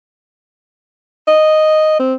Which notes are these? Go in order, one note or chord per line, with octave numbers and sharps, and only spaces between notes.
D#5
C4